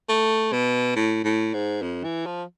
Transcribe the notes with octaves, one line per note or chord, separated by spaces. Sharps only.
A3
B2
A2
A2
G#2
F2
E3
F3